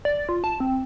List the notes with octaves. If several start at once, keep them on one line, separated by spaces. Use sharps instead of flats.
D5
F4
A5
C4